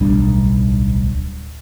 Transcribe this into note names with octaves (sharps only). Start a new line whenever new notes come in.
D1 B1 G3 D4